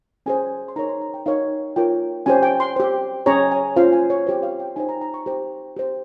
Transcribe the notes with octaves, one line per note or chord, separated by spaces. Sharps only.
C#4 G#4 C5 G#5
C6
D#4 A#4 C#5 A#5
C6
A#5
G5
D#4 A#4 C#5 F5
F4 A#4 C#5 G5
C#4 G4 C5 G#5
G5
C6
G4 C5
C#4 G#4 C#5 A#5
G#5
C#4 F4 C5 F5
G#5
C#5
G4 C5
F5
G5
D#4 G4 C5 G#5
A#5
A#5
C#6
G4 C5
G4 C5